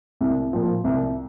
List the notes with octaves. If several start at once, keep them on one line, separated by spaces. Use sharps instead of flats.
C2
A#2 F3
C2